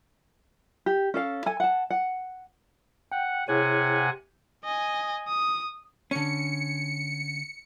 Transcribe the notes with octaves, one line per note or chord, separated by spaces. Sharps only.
G4
C#4 A4 F5
A4 G#5
F#5 A5
F#5
F#5 G5
C3 E4 G#4 C#5 F#5 G#5
D#5 G#5
D#6
D3 C#4 C#7